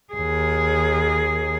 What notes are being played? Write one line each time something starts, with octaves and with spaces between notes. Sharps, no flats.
D#2 G#4